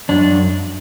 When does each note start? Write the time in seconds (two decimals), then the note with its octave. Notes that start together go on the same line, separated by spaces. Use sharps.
0.09 F#2 D4